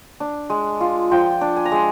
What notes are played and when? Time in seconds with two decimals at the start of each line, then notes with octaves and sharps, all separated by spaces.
0.20 D4
0.50 G#3
0.80 F4
1.11 F3 G5
1.41 D4
1.56 G#5
1.65 A#5
1.72 G#3 G#5